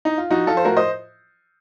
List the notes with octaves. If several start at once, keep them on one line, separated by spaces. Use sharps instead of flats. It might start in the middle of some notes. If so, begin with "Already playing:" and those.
D#4
F4
F3 D#4 F#4
F3 F4 A4
C5
A2 F#4 A#4
C5 D#5